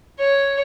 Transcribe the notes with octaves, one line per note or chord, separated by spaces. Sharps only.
C#5